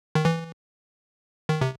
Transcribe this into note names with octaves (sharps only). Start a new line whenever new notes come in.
D#3
E3
D#3
C3